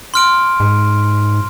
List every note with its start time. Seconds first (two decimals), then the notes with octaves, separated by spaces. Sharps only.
0.14 C6 F6 D7
0.60 G#2